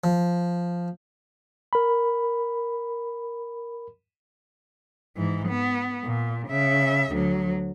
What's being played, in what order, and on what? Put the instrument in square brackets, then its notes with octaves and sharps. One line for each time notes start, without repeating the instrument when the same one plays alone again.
[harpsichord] F3
[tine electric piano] A#4 B5
[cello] G#2 E3
B3
A#2
C#3 E5
D2 F#3